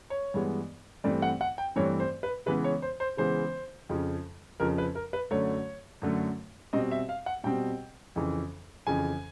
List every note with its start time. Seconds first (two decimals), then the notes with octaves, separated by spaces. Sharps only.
0.10 C#5
0.34 G2 E3 G#3 B3
1.04 G2 E3 A3 C4 D5
1.22 F#5
1.41 F#5
1.58 G5
1.76 G2 E3 A3 C4 C#5
2.00 C5
2.23 B4
2.46 C#3 E3 G#3 B3 B4
2.64 C#5
2.82 C5
3.00 C5
3.17 C#3 E3 G#3 B3 C5
3.89 F2 C#3 F3
4.60 F2 C#3 F3 A#4
4.78 B4
4.95 A#4
5.13 B4
5.31 F#2 D3 F#3 A3 C#5
6.02 F#2 D3 F#3 A3
6.73 B2 G3 C4 D#5
6.91 E5
7.09 F5
7.26 F#5
7.44 B2 G3 C4 G5
8.16 F2 C#3 E3
8.87 F2 C#3 E3 G#5